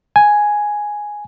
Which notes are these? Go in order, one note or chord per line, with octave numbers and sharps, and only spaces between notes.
G#5